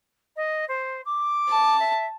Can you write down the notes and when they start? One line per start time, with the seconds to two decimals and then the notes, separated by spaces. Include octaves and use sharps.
0.36 D#5
0.68 C5
1.05 D6
1.49 A5
1.80 E5